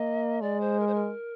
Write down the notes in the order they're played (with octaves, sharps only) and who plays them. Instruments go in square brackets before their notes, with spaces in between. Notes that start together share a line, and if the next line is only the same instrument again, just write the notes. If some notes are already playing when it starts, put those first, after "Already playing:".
Already playing: [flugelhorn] A#3 [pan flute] D#5
[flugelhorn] G#3 [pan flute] D5
[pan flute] C5
A#4
C5
A#4